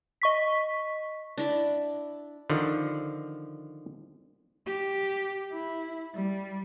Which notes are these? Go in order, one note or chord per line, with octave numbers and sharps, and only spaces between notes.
D#5 C#6 B6
D4 E4 B5
D3 D#3 F3
G4
E4
G3